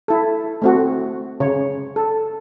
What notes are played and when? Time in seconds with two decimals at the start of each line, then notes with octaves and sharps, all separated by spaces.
0.08 E4 A4
0.62 A3 C4 F#4
1.40 C#3 C#5
1.96 A4